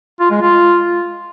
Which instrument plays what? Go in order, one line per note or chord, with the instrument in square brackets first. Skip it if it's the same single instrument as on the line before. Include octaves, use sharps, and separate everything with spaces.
[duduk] F4
G#3
F4